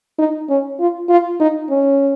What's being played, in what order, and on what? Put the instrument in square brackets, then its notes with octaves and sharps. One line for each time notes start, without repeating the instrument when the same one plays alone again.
[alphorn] D#4
C#4
F4
F4
D#4
C#4